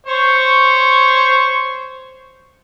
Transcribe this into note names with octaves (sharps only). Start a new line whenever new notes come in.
C5 C#5 C#6